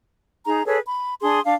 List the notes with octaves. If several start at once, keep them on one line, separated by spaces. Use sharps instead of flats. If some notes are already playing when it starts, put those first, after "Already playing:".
D#4 G#4 A#5
G#4 A4 B4 C#5
B5
D4 G#4 C6 D#6
D4 F5